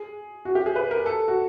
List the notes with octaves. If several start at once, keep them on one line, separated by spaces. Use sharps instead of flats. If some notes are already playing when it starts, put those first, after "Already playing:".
Already playing: G#4
F#4
G4
G#4
B4
A#4
A4
F#4